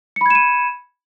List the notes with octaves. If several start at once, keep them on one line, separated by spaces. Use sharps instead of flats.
B5 G#6 C#7 D#7 E7